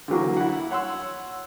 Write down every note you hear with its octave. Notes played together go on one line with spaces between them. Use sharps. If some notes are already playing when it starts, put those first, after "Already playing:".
D3 E3 F#3 A#3
E4 F#5
C#5 F#5 C6 E6